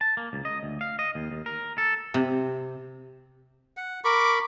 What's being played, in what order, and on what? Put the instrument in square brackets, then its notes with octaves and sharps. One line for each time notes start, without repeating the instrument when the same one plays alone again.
[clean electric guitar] A5
A#3
C#2
D#5
D2
F5
D#5
D#2
D#2
A#4
A4
[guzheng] C3
[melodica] F#5
[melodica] A#4 B5 C#6 [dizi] D6